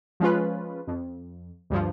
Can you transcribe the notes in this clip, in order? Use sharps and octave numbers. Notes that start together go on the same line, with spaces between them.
F3 G#3 C#4 F4 B4
F2
D2 G2 F3